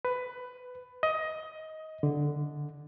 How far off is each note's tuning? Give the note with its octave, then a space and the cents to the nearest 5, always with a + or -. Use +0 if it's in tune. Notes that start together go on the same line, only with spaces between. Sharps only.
B4 +15
D#5 +15
D3 +0